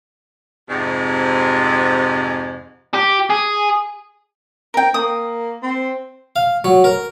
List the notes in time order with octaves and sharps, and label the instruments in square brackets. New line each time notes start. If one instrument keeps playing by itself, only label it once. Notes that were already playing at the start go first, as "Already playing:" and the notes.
[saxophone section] F2 G#2 C3
[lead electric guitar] G4
G#4
[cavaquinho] A#4 G5
[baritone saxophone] A#3 [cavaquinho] D#6
[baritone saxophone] C4
[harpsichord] F5
F#3
A#4